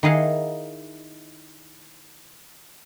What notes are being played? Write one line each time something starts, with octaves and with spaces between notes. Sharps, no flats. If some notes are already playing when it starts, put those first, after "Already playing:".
D#3 E4 G#4 D#5 F5 F#5